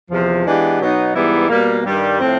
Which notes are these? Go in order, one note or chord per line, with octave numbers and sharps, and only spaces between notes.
E2 C3 F3
E3 G#3 B3 D4 G4
B2 F#3 B3 D#4
G#2 E3 G3 B3 E4
B2 G3 A#3
G2 D#3 G3
A2 F3 A3 C4